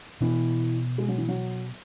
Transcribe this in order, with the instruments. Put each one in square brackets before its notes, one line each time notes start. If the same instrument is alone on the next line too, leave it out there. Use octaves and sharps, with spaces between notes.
[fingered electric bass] B2 B3 [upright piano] E3
[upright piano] G#3
F#3
E3
F#3